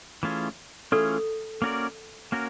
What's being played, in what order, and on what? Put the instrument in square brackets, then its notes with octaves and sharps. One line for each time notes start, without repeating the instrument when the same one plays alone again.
[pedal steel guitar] E3 A3 C#4 F4 G#4
[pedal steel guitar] E3 A3 C#4 F4 G#4 [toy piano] A4
[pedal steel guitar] A#3 C#4 F#4 A#4 D5
A#3 C#4 F#4 A#4